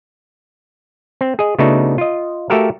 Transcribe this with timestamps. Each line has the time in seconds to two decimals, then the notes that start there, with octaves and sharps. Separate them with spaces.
1.21 C4
1.39 G#4 D#5
1.59 C#3 A3 B3 D4 D#4 F#4
1.98 F4 D#5
2.50 A3 F#4 G4 A4 A#4 F5